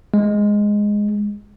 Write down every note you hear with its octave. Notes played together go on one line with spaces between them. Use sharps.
G#3